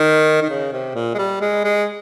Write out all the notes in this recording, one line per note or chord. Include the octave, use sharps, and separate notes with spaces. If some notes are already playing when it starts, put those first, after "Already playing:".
Already playing: D#3
D#3
C#3
C3
A#2
G#3
G3
G#3
G#3